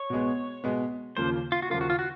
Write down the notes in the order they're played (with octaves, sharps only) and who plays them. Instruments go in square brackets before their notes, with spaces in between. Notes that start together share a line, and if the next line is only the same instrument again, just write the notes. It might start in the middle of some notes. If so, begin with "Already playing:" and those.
Already playing: [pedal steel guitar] C#5
[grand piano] B2 G#3 B3
B2 G#3 B3
[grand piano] D#2 C#3 F3 A#3 [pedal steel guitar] C5
[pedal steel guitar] F4
F#4
[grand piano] D#2 C#3 F3 A#3 [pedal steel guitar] F4
[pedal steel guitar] F#4
F4
F#4